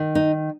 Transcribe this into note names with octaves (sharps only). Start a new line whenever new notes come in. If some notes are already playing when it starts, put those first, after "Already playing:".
Already playing: D#3
D#4